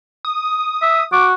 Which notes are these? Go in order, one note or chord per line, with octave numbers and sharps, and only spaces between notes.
D#6
E5
F#4 D6